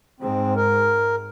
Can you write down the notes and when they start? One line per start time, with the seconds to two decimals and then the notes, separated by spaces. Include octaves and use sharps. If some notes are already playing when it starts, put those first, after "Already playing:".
0.20 G#2 C4
0.56 A#4